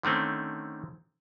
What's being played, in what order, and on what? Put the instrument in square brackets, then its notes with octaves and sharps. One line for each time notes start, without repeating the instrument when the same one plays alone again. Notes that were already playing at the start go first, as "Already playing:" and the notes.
[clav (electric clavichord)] D3 D#3 A3 C4 C#4